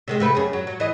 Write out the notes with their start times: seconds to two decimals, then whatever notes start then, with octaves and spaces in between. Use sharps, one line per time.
0.08 C3 D#3 G#3
0.20 C3 A3 B4
0.35 F#2 G#4
0.53 F#3
0.67 F#3
0.80 E3 D#5